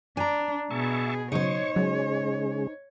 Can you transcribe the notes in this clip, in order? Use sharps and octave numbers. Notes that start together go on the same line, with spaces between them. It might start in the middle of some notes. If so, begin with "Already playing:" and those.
D4 G#5 A#5
B2 G#4 E5 A5 C#6
C#3 F#3 D#4 C5 C#5 C#6
C#3 F#3 G#3